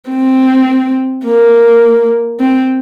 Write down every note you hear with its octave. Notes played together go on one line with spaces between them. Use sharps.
C4
A#3
C4